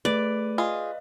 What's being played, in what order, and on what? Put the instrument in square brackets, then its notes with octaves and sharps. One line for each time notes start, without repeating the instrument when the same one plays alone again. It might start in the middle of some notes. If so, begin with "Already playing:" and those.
[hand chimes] A3 G#4 [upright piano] B4 [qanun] D5
[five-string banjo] F4 G#4 [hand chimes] D#5 F5